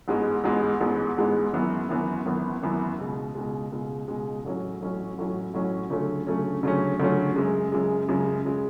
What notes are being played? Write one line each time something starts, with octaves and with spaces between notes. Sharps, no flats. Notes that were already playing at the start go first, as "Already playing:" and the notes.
A1 G#2 G#3 B3
A1 G#2 G#3 B3
A1 G#2 G#3 B3
A1 G#2 G#3 B3
G#1 F#2 E3 B3
G#1 F#2 E3 B3
G#1 F#2 E3 B3
G#1 F#2 E3 B3
C#2 B2 G#3
C#2 B2 G#3
C#2 B2 G#3
C#2 B2 G#3
A1 A2 F#3 C#4
A1 A2 F#3 C#4
A1 A2 F#3 C#4
A1 A2 F#3 C#4
D2 C#3 F#3 A3 C#4
D2 C#3 F#3 A3 C#4
D2 C#3 F#3 A3 C#4
D2 C#3 F#3 A3 C#4
F#2 C#3 G#3
F#2 C#3 G#3
F#2 C#3 G#3
C#3 G#3